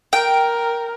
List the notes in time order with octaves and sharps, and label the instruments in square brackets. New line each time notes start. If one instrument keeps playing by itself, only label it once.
[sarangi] A#4 [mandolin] G5